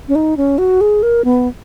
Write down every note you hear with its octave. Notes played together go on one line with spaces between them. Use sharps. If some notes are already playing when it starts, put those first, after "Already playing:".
C#4
D#4
C#4
F#4
G#4
A#4
B3